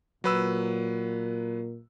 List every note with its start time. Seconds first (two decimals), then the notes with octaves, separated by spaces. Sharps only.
0.24 A#2 F#3 B4 E6